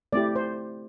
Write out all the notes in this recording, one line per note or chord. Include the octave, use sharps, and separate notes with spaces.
A3 C4 E4 G4 D5
C5